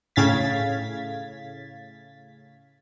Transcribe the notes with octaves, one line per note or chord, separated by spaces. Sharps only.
A2 C#3 F5 G#6 A6 B6